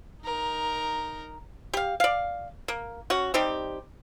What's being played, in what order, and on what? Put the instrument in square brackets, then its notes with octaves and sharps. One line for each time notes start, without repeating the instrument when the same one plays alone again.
[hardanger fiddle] D#4 A#4
[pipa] G4 F5
D5 F5
A#3
C#4 F#4
G3 C4 D#4 G4